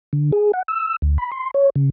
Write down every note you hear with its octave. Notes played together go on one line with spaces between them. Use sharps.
D3
G#4
F#5
E6
D2
B5
C6
C#5
C#3